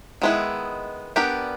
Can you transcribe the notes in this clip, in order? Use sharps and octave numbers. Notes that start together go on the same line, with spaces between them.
D#3 G#3 B3 E4
B3 D4 G4 A#4